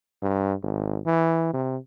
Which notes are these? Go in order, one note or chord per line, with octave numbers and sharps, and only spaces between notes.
G2
G#1
E3
C3